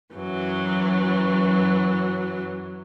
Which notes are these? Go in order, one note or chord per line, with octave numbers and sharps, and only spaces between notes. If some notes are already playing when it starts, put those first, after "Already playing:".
F#2 E3 F#3